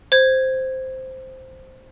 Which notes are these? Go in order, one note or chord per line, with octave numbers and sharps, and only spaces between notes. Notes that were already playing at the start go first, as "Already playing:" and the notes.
C5 G#6